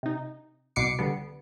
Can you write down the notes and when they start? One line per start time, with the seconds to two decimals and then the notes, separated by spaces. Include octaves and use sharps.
0.03 C3 D#4
0.76 C2 B2 D6 C7 C#7
0.99 D3 G3 B3